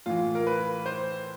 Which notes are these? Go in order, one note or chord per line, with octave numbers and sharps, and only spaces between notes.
A2 E3 F4
A#4
B4
C5